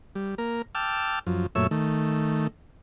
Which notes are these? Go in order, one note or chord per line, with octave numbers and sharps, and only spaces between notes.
G3
A#3 A#4
G5 A5 D6 E6 F6
F#2 F3
F#2 A#2 A3 C#5 E5 E6
D#3 A3